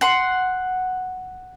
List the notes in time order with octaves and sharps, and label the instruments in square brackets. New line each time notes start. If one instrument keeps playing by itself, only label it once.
[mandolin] F#5 C6